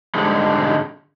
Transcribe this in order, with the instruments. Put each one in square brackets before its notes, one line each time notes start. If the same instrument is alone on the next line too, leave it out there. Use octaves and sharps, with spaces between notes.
[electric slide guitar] G#2 D3 G3 G#3